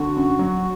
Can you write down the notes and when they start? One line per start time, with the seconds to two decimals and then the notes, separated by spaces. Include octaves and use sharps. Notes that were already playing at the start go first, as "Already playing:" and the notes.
Already playing: D3 F#4
0.16 F#2
0.39 F#3